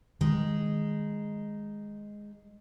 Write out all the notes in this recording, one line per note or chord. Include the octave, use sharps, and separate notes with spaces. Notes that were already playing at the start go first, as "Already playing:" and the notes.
D#3 G#3 D#4